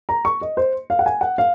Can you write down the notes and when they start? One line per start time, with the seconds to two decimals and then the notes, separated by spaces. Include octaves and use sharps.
0.09 A#5
0.25 C#6
0.41 D#5
0.57 C5
0.90 F5
0.99 F#5
1.06 G#5
1.21 F#5
1.38 F5